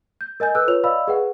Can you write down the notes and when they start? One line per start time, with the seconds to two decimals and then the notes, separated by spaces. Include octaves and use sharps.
0.21 G6
0.40 A#4 D#5 G#5 G6
0.55 A4 B4 E6 F#6
0.68 F4 B4 C#5 F7
0.84 D5 D#5 F5 B5 E6
1.08 G#4 B4 F#5